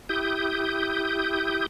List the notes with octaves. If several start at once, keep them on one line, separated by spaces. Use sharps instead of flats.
E4 G4 D#6 G6